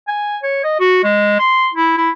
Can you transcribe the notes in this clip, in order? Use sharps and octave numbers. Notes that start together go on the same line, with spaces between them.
G#5
C#5
D#5
F#4
G#3
C6
E4
E4